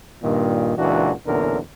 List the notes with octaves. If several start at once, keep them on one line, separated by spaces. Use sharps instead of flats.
G2 A#2 D#3
C#2 A#2 E3 D4 F#4
B1 E2 A#2 D3 C#4 A#4